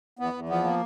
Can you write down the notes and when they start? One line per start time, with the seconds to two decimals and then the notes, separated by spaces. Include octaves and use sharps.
0.19 E2 B3
0.34 E2
0.49 F3 B3
0.64 A#3